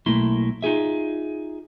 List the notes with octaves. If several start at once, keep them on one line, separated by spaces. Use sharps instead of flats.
B1 A3 A#3 E4 C6
D#4 F4 G#4 E5